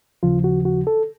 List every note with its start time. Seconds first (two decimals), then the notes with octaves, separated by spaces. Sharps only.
0.23 D#2 C#3 F3 F4
0.44 F#4
0.65 F#4
0.87 A4